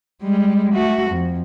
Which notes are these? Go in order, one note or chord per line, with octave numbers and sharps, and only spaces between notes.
G3 G#3
A3 F#4
F2